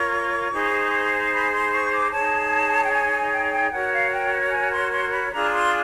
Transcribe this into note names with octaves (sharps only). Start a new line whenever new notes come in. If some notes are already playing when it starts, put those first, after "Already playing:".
Already playing: F4 A#4 C#5 C#6
D#4 G#4 C5
B5
C6
C#6
D6
D#4 G#4 C#5 A5
G5
G#5
G#5
G5
G5
F#4 A#4 C#5 F#5
F5
G5
G#5
C6
C6
B5
D4 F4 G#4 A#5
C6